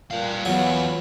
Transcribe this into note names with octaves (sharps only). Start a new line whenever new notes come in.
A#2 G3 F5
E2 F#3 B3 F4